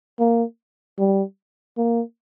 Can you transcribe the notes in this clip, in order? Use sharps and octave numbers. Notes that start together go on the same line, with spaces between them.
A#3
G3
A#3